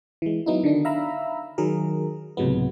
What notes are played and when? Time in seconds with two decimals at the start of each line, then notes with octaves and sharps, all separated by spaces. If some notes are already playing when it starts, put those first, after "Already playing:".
0.22 E3 G#3
0.46 F#3 B3 D#4 E4
0.63 D3 D#3 D4
0.85 E5 F5 A#5 B5 E6
1.58 D#3 F#3 G#4 A#4
2.37 C#2 A2 C3 F#3 G#3 B3